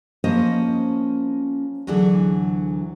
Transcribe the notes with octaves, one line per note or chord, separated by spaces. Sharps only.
F3 A#3 C#4 C5 D#5
D2 E3 F#3 D4 G#4